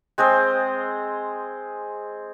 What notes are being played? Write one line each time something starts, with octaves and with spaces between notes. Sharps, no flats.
G#3 C4 G#4 C5